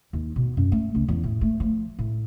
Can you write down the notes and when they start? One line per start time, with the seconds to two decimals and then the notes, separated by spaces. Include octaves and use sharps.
0.13 D#2
0.36 B2
0.57 F#2
0.72 A3
0.95 C#2
1.08 E2
1.24 A2
1.41 A3
1.60 F3
1.99 A2